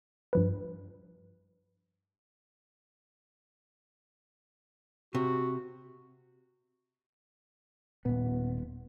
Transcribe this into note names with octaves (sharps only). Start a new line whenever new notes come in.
G2 F3 B4
C3 F#4
D#1 A#2 B3